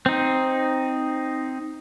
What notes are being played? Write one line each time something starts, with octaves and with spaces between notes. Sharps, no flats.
C4 D#4